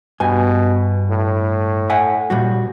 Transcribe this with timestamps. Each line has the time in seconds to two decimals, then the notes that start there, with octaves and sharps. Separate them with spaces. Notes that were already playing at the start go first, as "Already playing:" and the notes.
0.20 G2 B2 G#5
1.10 A2
1.90 E5 F#5 G#5
2.30 A#2 G3 F#4